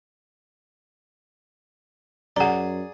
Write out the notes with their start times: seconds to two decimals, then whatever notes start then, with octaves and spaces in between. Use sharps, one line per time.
2.36 F#2 G#4 D5 F#5 A#5